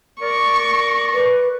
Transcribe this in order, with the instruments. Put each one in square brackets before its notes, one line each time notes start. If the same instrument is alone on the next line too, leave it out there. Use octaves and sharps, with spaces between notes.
[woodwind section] A#4 D5 [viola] C#6
[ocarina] B4